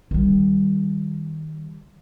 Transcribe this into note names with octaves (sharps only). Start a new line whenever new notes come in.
D#3 G3